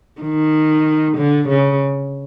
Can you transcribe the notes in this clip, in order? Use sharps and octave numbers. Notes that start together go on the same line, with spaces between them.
D#3
D3
C#3